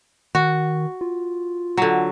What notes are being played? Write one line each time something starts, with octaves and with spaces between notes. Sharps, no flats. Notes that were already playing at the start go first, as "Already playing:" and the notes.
D#3 F#4
F4
D3 F#3